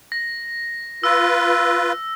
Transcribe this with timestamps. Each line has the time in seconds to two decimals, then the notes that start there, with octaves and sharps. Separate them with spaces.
0.12 A#6
1.04 F4 B4 E6